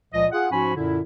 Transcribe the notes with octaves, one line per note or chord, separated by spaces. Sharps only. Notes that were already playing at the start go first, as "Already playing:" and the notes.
C#2 A#2 F3 D#5
F4 G#4 F#5
G#2 F3 C#4 F#4 G#5 B5
F#2 A#2 D3 E4